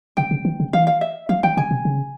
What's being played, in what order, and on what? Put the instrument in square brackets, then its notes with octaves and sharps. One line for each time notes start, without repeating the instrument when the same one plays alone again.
[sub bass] C#3 [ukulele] G5
[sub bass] C#3
E3
C#3
[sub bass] E3 [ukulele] F5
[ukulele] F5
E5
[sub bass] F3 [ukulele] F5
[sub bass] E3 [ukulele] G5
[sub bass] C#3 [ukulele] G#5
[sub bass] C3
C#3